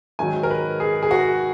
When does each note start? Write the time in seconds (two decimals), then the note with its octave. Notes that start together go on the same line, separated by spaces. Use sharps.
0.19 G#2 D#3 F#3 G#5
0.43 A#4
0.50 B4
0.80 G#4
1.03 G#4
1.11 F#4